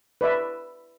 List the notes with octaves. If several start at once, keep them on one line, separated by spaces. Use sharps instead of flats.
B4 D5 E5